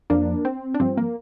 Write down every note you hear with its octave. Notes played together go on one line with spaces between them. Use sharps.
F2 F3 A#3 D4
C4
D4
G2 F3 C4
A#3